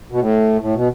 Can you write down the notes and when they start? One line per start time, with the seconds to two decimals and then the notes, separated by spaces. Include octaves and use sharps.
0.11 B2
0.20 A2
0.62 A2
0.75 B2